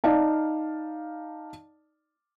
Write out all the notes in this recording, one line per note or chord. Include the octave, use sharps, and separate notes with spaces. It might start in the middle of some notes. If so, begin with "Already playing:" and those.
D#4 D5 F5 A5